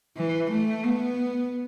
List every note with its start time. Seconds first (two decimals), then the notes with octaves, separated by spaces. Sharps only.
0.17 E3
0.51 A3
0.85 B3